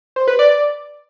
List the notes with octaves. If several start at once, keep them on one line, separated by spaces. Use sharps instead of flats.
C5
B4
D5